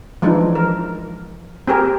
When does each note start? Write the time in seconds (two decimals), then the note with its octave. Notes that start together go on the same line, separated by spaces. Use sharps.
0.22 E3 F3 G#3 D4 D#4
0.55 A#4
1.68 C4 G4 G#4 A#4